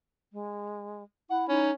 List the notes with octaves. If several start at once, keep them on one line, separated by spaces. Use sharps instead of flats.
G#3
E4 F#5
C#4 D#4